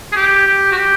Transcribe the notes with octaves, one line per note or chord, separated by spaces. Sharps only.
G#4
G4
G4
F#4
G4